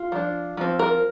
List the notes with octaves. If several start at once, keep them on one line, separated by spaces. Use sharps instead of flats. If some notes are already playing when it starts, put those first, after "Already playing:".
Already playing: F4
F3 D4
F3 C4
A#4